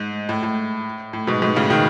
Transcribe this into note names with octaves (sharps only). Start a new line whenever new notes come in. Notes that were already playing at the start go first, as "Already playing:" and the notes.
Already playing: G#2
A2
A2
A2
G#2 B2
G#2 B2
A2 C#3
B2 D#3